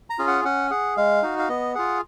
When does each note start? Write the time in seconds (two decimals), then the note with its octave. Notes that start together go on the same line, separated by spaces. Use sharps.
0.10 A#5
0.19 C#4 F4 G#4
0.28 F#5
0.45 C#4 F#5
0.71 G#4 F#5
0.97 G#3 F5
1.23 D#4 F#4
1.39 F5
1.49 B3 D#5
1.75 F4 G#4 F#5